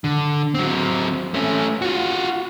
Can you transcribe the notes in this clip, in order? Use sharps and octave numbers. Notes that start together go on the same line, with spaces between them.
D3
F#3 C4
A3 C#4
F4 F#4